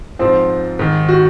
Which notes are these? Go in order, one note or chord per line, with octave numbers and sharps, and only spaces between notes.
G#2 F3 C4 C5
G#2 D#3
F#4